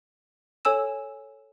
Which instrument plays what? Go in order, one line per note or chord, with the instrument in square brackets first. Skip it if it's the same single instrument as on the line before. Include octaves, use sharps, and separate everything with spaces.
[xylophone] A4 C#5 G#5 E6 E7